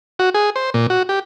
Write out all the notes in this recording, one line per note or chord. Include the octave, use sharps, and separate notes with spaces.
F#4
G#4
C5
A#2
F#4
G4